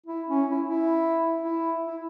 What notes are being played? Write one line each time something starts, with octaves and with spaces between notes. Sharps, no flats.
E4
C#4
E4
E4
E4
E4